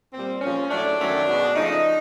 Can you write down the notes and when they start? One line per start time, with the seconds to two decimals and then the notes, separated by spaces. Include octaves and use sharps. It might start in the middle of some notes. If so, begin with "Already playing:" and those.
0.14 A#2 G3 C4
0.41 A#2 F3 G#3 C#4
0.71 A2 F#3 A3 D4
0.99 F#2 D#3 F#3 A3
1.27 B2 G#3
1.55 C#3 F3 A3 D#4